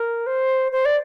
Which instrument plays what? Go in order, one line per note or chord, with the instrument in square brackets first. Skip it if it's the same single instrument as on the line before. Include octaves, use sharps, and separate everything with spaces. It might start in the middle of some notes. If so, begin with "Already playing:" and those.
Already playing: [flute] A#4
C5
C5
D5